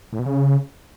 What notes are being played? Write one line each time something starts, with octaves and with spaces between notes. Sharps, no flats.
A2
B2
C#3